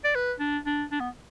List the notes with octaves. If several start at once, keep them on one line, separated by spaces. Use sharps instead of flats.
D5
B4
D4
D4
D4
B3